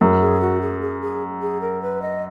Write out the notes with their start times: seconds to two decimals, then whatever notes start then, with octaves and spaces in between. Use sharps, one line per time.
0.01 F#2 G#4
0.21 G#4
0.41 F#4
0.61 G#4
0.81 G#4
1.01 G#4
1.42 G#4
1.61 A#4
1.82 B4
2.02 D#5